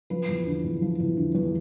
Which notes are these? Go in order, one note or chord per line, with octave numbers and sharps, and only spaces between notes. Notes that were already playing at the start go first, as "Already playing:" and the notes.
F3 B4
E2
D3
E2
F3
E2
D3
E2